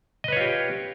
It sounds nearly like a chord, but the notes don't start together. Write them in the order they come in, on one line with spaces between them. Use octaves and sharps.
D#5 B4 C#5 F4 G4